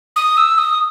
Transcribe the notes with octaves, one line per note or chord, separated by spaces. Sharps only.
D#6
E6
D#6